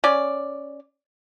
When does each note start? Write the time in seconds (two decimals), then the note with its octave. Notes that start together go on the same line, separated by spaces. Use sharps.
0.04 C#4 D5